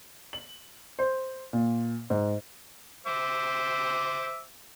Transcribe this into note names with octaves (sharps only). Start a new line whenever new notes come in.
F#7
C5
A#2
G#2
C5 E5 D6